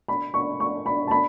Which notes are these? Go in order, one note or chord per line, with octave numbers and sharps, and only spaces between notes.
B5
C#6
C#6
B5
A5
B5